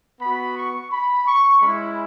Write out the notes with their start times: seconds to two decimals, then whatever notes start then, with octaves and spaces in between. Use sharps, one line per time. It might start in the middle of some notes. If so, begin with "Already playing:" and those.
0.21 B3 F#4 B5
0.57 C#6
0.91 B5
1.27 C#6
1.61 G#3 C#4 E4 B5